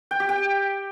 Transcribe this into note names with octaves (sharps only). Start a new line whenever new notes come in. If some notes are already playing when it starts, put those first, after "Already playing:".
G5
G4
G5